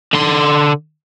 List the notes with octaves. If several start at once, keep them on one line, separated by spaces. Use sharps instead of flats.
D3 C6